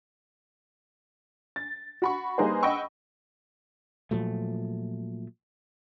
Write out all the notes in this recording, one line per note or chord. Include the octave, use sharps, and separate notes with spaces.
A6
F#4 B5 C#6
G3 A#3 D#4 G#4 B4 C5
D#5 F#5 G5 B5 C#6 E6
A#2 F3 F#3 A3